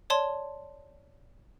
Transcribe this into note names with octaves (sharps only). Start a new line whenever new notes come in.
C#5 D5 A5 C6